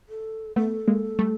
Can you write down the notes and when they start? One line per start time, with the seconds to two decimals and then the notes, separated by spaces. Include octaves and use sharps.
0.09 A4
0.56 A3 B3 A4
0.88 G#3 A#3
1.19 G3 A3